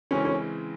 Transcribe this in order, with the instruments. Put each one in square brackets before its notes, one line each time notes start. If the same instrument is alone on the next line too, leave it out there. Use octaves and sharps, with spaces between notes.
[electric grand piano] C#3 E3 G#3 C4 [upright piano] C#4
[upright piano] C#4